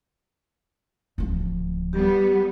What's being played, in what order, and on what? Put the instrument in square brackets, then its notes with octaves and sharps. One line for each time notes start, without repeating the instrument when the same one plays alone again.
[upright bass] D1 F3
[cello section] G3 B3 [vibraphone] G4